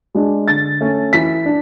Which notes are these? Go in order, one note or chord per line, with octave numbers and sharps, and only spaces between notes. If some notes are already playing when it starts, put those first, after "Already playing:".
G#3 D4
D3 A6
A3 C#4
E3 B6
D4